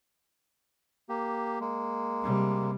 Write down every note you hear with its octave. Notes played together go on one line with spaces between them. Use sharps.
A#3 G4
G#3 A#3
C3 G3